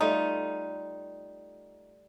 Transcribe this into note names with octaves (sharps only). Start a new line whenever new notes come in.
G3 A3 D#4 F4